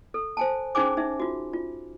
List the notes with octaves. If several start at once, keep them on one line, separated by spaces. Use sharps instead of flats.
A4
C5 G#5 A5
C#4 D#4 G#4 C5 G#5 D6
D#4 E5
F4 F#4
F4